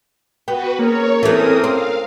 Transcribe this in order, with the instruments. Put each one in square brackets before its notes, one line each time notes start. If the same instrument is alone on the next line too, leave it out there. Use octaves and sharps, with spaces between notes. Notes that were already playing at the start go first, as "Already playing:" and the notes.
[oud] B3 [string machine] F#4 B4 [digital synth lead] G5
[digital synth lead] A#3 [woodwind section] C#4 G#4 A#4 [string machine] C#5
[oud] E3 A3 [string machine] C4 D#6 [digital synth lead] A4
[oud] C4 [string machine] F5